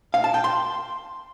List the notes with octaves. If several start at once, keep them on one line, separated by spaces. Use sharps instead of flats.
F5
A5
G5
C6